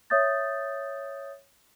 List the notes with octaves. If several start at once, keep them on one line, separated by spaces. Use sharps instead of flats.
C#5 E5 D#6 G6 A6